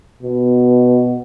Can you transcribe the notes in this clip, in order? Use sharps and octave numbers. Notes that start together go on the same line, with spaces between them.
B2